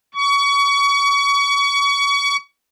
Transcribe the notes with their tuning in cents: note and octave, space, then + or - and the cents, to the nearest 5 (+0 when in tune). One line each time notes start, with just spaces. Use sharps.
C#6 +30